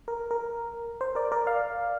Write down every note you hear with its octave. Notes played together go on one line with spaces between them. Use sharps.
A#4
A#4
C5
A#4 D5
A#4 D5
D5 F5